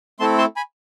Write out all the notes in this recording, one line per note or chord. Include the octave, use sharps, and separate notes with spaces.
A3 C4 E4 A4 A5 C6
A5 C6
G#5 B5